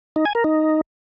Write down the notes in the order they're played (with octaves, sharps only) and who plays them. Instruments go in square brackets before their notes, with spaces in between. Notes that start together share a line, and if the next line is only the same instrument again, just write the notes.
[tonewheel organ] D#4
G#5
A#4
D#4